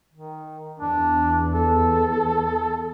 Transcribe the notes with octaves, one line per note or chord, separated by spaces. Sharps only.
D#3
E2 D4
A4